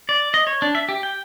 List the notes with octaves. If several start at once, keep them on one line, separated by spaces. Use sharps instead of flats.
D5
D#5
C#5
D4
E5
G4
G5